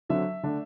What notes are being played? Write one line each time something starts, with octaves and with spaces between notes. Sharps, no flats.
D3 F#3 C4 E5
D3 A3 D4